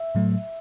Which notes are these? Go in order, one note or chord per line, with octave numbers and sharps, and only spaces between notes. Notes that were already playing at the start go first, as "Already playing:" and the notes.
Already playing: E5
A2 F#3 A3